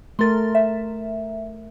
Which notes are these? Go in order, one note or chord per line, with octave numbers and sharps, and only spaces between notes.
A3 A#4 C6 A6
E5